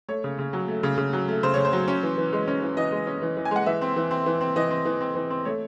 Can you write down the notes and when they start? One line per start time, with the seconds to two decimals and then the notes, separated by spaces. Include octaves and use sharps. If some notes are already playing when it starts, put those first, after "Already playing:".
0.08 A3 C#5
0.24 C#3
0.39 C#3
0.53 F#3
0.68 A3
0.83 C#3
0.98 C#3
1.13 F#3
1.28 A3
1.43 C#3 C5
1.54 C#3 C#5
1.65 C5
1.73 F#3
1.88 C#4
2.03 E3
2.18 E3
2.33 G#3
2.47 C#4
2.62 E3
2.77 E3 D#5
2.92 G#3
3.07 C#4
3.22 E3
3.37 E3
3.45 G#5
3.51 G#3 F#5
3.66 E3 E5
3.81 C4
3.96 E3
4.11 C4
4.26 E3
4.41 C4
4.56 E3 D#5
4.70 C4
4.85 E3
5.01 C4
5.15 E3
5.30 C4
5.45 A3 C#5